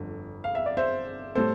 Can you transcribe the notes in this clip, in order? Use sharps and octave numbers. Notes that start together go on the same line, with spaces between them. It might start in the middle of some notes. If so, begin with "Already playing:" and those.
Already playing: G1 F2 D3
F5
E5
D5
C5 E5
A2 G3 A4 C5